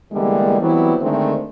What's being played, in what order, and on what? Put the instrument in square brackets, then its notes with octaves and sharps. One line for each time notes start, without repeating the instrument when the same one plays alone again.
[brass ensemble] E2 D3 E3 G3 G#3 A#3
E3 F#3 G3 B3 C4 E4
D3 D#3 G#3 A3 C4 D4